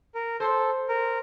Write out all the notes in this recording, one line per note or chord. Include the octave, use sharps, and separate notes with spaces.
A#4
A4 C5
A#4